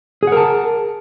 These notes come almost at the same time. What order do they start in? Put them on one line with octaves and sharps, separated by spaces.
G#4 F#5 A#4 A5